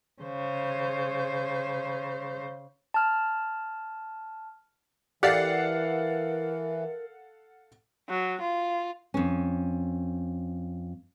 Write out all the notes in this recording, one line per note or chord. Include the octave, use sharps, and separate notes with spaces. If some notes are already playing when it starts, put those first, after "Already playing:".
C#3 C5
A5 F6
E3 G4 A4 A#4 D5 F5 F#5 C7
F#3
F4
F2 C#4